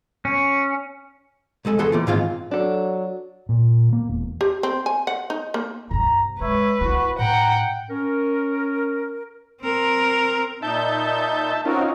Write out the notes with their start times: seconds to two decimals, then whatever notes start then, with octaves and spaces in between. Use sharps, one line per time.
0.25 C#4
1.65 C2 G#3 A4 G#5
1.78 D#2 E3 B3 G#4 A4 C6
1.92 E3 A#3 F4
2.07 G#2 D#3 C4 F4 G#4 F5
2.51 F#3 D4 A4
3.49 A#2
3.93 A#3
4.09 E1
4.41 G4
4.63 C4
4.86 G#5
5.07 F#5
5.30 D#4
5.54 A#3
5.91 G2 C3 A#5
6.41 G#3 B4 C#5 E5
6.81 B3 E4 F#4
7.19 A2 F#5 G5 A#5
7.90 C#4 A#4
9.61 C4 A#4
10.62 A#2 D#4 E5 A5 G6
11.65 C4 C#4 D#4 F4 F#4 A#4